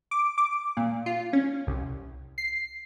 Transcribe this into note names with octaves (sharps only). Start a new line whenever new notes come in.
D6
D6
A#2
F4
C#4
C2
C7